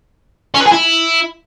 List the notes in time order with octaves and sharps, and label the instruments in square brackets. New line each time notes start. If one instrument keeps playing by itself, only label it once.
[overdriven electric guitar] C#4
B4
G#4
E4